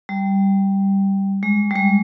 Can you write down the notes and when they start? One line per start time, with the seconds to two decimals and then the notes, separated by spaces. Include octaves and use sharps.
0.09 G3
1.43 G#3
1.71 G3
1.76 G#3